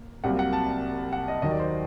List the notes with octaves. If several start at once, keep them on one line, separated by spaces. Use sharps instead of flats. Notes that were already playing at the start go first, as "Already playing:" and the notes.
Already playing: A#3
C2 C3 F#3 A#3 F#5
F#5
A5
F#5
D#5
D#2 D#3 F#3 D#5
D5
C5
D5